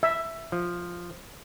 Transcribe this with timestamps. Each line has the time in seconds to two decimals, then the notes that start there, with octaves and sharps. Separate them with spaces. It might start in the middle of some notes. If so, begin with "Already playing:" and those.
0.03 E5
0.52 F3